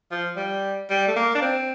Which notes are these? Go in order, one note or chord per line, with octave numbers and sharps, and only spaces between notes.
F3
G3
G3
A3
A#3
D4
C4